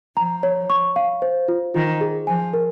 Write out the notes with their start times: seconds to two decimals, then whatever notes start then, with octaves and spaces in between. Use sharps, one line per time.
0.17 F3 A#5
0.43 C#5
0.70 C#6
0.96 F5
1.22 C5
1.48 F4
1.74 D#3 F4
2.01 G#4
2.27 F3 G#5
2.53 A#4